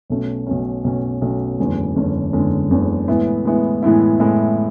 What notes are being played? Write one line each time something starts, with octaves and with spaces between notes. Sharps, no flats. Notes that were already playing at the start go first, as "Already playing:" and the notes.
B1 B2 A3 C#4
B1 B2 A3 C#4
B1 B2 A3 C#4
B1 B2 A3 C#4
F#1 E2 D3 G#3 C#4
F#1 E2 D3 G#3 C#4
F#1 E2 D3 G#3 C#4
F#1 E2 D3 G#3 C#4
A2 E3 G#3 B3 E4
A2 E3 G#3 B3 E4
A2 E3 G#3 B3 E4
A2 E3 G#3 B3 E4